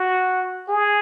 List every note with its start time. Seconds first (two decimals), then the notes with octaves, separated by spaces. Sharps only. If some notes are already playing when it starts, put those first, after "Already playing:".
Already playing: F#4
0.69 G#4